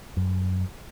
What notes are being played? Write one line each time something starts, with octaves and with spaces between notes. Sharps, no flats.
F#2